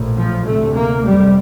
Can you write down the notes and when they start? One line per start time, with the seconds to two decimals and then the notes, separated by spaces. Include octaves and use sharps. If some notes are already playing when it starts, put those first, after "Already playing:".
Already playing: A#1 A2
0.17 F3
0.45 D2 C3 A3
0.75 A#3
1.05 F1 F2 C3 G3